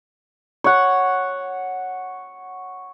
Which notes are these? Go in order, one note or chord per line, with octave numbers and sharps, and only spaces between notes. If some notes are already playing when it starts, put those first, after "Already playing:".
C#5 F#5